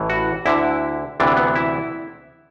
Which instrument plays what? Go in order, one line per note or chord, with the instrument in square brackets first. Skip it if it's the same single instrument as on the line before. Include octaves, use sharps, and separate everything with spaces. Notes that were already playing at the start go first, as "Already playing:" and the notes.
Already playing: [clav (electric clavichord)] A1 A2 E3
F#4
D2 D3 E4
D2 C3 E3 D4
B3
E4